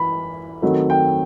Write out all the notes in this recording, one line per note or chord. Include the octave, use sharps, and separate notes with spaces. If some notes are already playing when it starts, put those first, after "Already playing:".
Already playing: E3 B5
D#3 F#3 A3 C4
G5